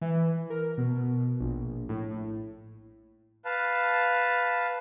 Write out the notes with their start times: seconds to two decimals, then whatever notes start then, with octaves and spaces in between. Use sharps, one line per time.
0.01 E3
0.50 A#4
0.78 B2
1.40 A#1
1.89 A2
3.45 B4 F5 A5